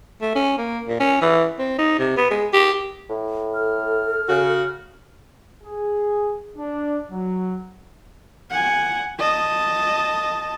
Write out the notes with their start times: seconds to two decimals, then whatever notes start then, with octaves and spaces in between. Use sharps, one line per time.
0.21 A3
0.35 C#4
0.58 A#3
0.88 A#2
1.00 C#4
1.21 E3
1.59 C4
1.79 D#4
1.99 C3
2.17 B3
2.31 G#3
2.53 G4
3.10 A2
3.54 A4 F6
4.28 C#3 F#4
5.64 G#4
6.57 D4
7.11 F#3
8.50 F#5 G#5
9.19 D#5 A5